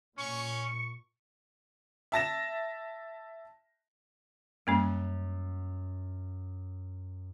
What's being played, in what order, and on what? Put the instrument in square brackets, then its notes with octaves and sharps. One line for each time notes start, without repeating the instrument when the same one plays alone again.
[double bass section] A#2 [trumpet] C#4 [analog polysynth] C#6
[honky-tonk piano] E5 A5 A#6 E7
[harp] F#2 [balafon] G3 A#3 C#4